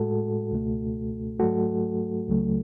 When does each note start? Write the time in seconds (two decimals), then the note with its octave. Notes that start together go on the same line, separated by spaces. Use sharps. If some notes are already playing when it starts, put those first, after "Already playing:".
Already playing: A2 G#3 F#4 A4
0.52 C#2 B2 A3
1.39 G#2 F#3 A3 F#4 A4
2.28 C#2 C#3 F#3 A3